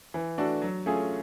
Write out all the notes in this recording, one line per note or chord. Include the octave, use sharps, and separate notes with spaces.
E3
A3 D4 F#4 A4
F#3
A3 C#4 F4 G#4